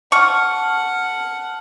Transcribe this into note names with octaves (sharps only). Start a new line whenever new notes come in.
F#5 A5 C#6 F6